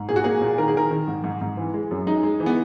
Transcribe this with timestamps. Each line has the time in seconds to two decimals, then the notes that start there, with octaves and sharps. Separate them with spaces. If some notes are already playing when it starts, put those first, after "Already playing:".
Already playing: G#2
0.09 A#2 G#4
0.16 F#4
0.24 A#3 G#4
0.42 A#2
0.58 D#3 A#4
0.68 G#4
0.75 D#3 A#4
0.91 D#3
1.08 G#2
1.24 G#2
1.41 G#2
1.57 E3
1.74 G#3
1.91 F#2
2.07 G#3 D#4
2.23 G#3
2.40 E3
2.46 B3